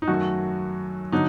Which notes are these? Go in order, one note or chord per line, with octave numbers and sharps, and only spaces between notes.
D#4
F#2 D#3 A3 F#4
D3 F#3 D#4